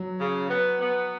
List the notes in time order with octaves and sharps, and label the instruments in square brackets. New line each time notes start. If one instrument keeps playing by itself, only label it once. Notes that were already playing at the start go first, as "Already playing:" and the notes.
Already playing: [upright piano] F#3
[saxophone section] C#3
B3
B3